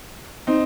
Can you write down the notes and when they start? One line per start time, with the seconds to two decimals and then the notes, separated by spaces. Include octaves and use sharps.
0.47 C4 D#4